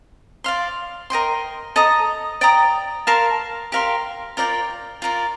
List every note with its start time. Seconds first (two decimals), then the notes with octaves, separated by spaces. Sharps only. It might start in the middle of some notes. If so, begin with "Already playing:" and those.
0.44 D5 F5 C6
1.10 A#4 D#5 G5 C6
1.76 A4 D#5 A#5 D#6
2.41 D5 G5 A#5 D#6
3.07 A#4 F5 A5 C6
3.72 G4 A#4 F5 C6
4.37 F4 A#4 D5 G5
5.02 F4 A#4 D5